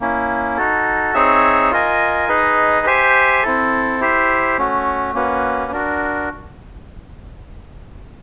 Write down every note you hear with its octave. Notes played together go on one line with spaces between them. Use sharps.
A#3 C#4 E4
D#4 F#4 A4
C4 D#4 G#4 C#5 E5
F4 A#4 D#5 G#5
D#4 G#4 B4 D#5
G4 C5 E5 G#5
C4 E4 A4
E4 G4 C5 E5
A3 C#4 F#4
A#3 C#4 F#4 B4
D4 F#4 A#4